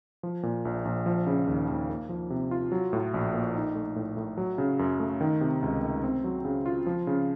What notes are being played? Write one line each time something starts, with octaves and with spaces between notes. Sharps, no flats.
F3
A#2
A#1
A#1
F3
C#3
D#2
D#2
A#3
F3
C3
F4
F#3
A2
A#1
A#3
D#4
A3
A2
A2
F#3
C#3
F#2
A3
D#3
C3
C#2
A3
C4
F#3
C#3
F4
F3
C#3